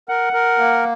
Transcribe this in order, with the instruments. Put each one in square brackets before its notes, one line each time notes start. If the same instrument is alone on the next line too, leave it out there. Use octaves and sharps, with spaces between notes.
[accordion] A#4 [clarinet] F#5
[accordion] A#4
A#3